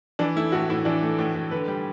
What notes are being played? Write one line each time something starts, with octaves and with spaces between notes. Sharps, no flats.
E3 D4
A3 E4
A2 F#4
A2 E4
E3 D4
A3
A2
A2
D3 B4
G3